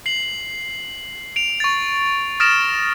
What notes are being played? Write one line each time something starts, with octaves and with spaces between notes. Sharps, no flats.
C7 F#7
D7 F7
C#6 A6
D#6 F6 A6 A#6 D7 E7